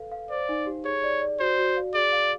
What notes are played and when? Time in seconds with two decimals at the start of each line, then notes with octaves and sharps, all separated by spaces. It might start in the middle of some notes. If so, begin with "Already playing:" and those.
Already playing: A4 B4 F5
0.12 F5
0.30 C5 D5
0.49 D#4
0.66 G4
0.85 G#4 C#5
1.03 D5
1.22 D5
1.40 F#4 C5
1.58 F#4
1.77 F5
1.94 G#4 D5
2.12 F5